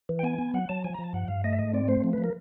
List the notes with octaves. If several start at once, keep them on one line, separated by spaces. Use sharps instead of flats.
E3
G5
B3 G#5
B3
F#3 F#5
F#3 A5
F3 G#5
A#5
F3
A5
G2 F#5
G2 F5
A3 D#5
E5
G#2 D#5
C4 D5
A3 C5
F3
B4
F3
A#4